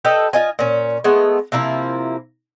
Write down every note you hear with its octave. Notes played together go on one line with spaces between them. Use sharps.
G4 A4 B4 D#5
F4 D#5 G#5
A#2 C#4
G#3 A3 B3
C3 F3 A#3 E4